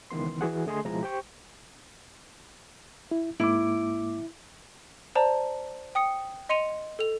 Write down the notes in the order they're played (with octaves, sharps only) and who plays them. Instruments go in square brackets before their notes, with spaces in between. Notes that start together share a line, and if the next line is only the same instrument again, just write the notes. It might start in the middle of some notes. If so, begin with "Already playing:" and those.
[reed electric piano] C#2 D#3 E3 B3 C6
E3 F#4 G#4 F#5
D3 A3 G#4 D#5 G#5 C6
C#2 B2 F3 G#3 E4 A#5
G4 C5 G5 C#6
E4
[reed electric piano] G#2 A#3 D6 [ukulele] E4
[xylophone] C5 D5 A5 A#5
G5 D#6 C#7
D#5 C6 C#7 D#7 F7
A4 F7